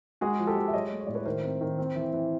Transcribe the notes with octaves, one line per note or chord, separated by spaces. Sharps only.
G#3 F#4 G#4
F3
G4 A4
G#3
E5
F#3 C#5 D#5
A3
C#5
A2 D5
B4 C#5
D#3 A#4 C5
C4
D#3
C4
E3
E3